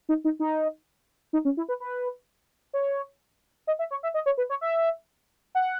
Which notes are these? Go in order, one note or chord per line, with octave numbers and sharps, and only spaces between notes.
D#4
D#4
D#4
D#4
C#4
E4
B4
B4
C#5
D#5
E5
C#5
E5
D#5
C#5
B4
C#5
E5
F#5